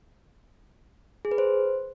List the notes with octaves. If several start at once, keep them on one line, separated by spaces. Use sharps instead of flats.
G#4
B4
C5